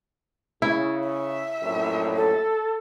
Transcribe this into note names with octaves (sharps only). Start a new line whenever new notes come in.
C#3 E4
E5
A#1 F#2 A2
A4